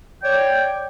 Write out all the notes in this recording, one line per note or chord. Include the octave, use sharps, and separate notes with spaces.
C#5 D5 G5